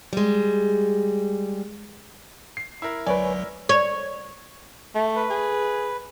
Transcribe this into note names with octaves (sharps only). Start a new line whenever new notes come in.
G3 G#3
C7
E4 A#4
G1 C#2 F#3 B4 C#5 D5 G#5
C#5
A3
B4
G#4